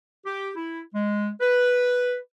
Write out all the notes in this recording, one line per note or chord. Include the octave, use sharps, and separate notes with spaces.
G4
E4
G#3
B4